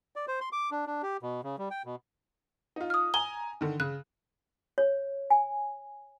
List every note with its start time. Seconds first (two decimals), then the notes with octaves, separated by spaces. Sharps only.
0.16 D5
0.28 C5
0.41 C6
0.53 D6
0.71 D4
0.87 D4
1.03 G4
1.22 B2
1.43 C#3
1.58 G3
1.70 G5
1.85 B2
2.76 D#4 F4
2.90 D#6 F6
3.14 G#5 A#5 G7
3.61 D3 D#3
3.80 C#3 F#6
4.78 C#5
5.30 G#5